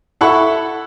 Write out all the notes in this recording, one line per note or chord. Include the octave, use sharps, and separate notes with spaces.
E4 A4 F#5 B5 C#6